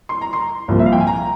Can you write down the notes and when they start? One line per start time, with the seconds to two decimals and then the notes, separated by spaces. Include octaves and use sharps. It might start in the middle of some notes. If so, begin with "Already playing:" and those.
0.09 C6
0.21 A#5
0.33 C6
0.68 C2 A#2 F3
0.79 E5
0.86 F5
0.92 G5
1.00 G#5
1.07 A#5